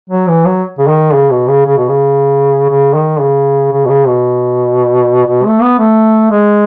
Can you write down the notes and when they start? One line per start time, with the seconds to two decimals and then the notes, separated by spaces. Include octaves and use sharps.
0.10 F#3
0.28 E3
0.45 F#3
0.79 C#3
0.88 D#3
1.13 C#3
1.31 B2
1.48 C#3
1.66 C#3
1.78 B2
1.89 C#3
2.69 C#3
2.94 D#3
3.20 C#3
3.72 C#3
3.85 B2
3.89 C#3
4.07 B2
5.27 B2
5.45 A3
5.62 B3
5.79 A3
6.31 G#3